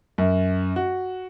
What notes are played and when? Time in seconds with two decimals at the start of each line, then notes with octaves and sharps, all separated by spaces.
0.18 F#2
0.76 F#4